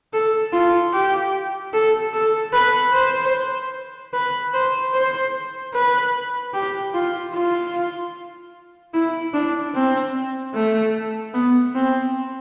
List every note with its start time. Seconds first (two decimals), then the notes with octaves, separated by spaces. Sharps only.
0.13 A4
0.53 F4
0.93 G4
1.73 A4
2.14 A4
2.53 B4
2.93 C5
4.14 B4
4.54 C5
4.94 C5
5.74 B4
6.54 G4
6.94 F4
7.34 F4
8.94 E4
9.34 D4
9.74 C4
10.54 A3
11.34 B3
11.75 C4